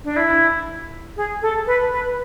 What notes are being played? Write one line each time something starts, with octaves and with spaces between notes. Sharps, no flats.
D4
E4
G#4
A4
B4
B4